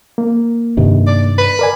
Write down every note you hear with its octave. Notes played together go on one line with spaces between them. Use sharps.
A#3
G2 C3 D#3
D5
B4
A#4 D5 G#5